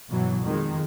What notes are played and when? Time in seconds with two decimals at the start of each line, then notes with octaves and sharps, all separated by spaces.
0.12 G2 B2 E3 F#3
0.44 F2 D#3 G#3